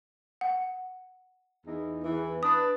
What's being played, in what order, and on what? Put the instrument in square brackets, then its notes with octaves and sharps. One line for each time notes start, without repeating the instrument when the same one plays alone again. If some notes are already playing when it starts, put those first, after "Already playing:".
[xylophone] F#5
[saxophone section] E2 E3 D#4
E2 E3
[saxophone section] D4 B4 [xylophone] D#6